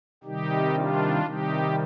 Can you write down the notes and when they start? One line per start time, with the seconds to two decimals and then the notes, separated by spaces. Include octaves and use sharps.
0.24 C3 D#3 G3 D#4 G4
0.74 D4 F4
1.23 C3 D#3 G3 D#4 G4